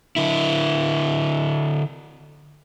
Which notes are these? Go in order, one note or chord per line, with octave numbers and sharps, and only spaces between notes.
D3 E4